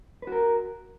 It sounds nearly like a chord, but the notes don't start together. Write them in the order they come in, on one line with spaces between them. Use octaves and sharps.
B4 F#4 A#4